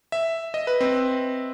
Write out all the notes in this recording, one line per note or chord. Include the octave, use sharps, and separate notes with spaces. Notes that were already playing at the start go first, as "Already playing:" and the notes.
E5
D#5
B4
C4